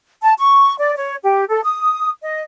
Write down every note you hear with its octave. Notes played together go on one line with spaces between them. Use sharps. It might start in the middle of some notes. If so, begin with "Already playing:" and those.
A5
C#6
D5
C#5
G4
A4
D#6
D#5